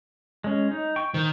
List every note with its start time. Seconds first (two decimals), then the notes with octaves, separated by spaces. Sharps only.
0.44 G#3 C#4
0.71 D#4
0.96 G5 C#6
1.14 D#3 C5